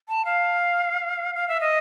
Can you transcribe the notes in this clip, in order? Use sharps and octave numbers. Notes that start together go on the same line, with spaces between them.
A5
F5
F5
E5
D#5